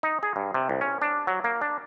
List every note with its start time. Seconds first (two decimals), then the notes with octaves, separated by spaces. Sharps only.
0.03 D#4
0.23 G#4
0.36 G2
0.54 C3
0.69 C2
0.81 C#4
1.02 D4
1.27 F#3
1.44 A#3
1.62 D4